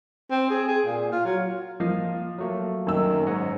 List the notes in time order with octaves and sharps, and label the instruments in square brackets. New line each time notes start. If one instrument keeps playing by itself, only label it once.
[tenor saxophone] C4
G#4
G#4
A#2
F4
F#3
[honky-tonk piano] F3 [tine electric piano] A#3 D#5 F5
[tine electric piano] F#3 A3 A#3
[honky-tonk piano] F#2 E6 [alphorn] D#3
[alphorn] G#2 [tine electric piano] C#5 D#5 F#5